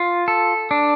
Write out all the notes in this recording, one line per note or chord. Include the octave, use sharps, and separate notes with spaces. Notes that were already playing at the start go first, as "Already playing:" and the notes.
Already playing: F4
A4
D4